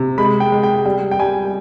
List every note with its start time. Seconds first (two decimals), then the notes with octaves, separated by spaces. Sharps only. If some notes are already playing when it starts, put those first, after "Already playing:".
Already playing: C3
0.18 G#3 B5
0.40 G5
0.52 G#3
0.63 G5
0.85 G3 G5
1.11 G5
1.20 G3 G#5